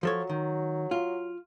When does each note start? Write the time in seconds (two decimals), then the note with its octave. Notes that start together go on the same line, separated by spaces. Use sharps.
0.03 F3 F#3 A4 C#5
0.29 D#3
0.91 F4